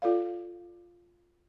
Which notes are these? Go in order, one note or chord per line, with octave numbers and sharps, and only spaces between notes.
F4 A4 D5 F5